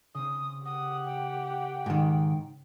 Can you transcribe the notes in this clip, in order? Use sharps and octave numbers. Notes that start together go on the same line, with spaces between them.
C#3 C4 D#6
G4 F#5 D#6
G5
G#2 D#3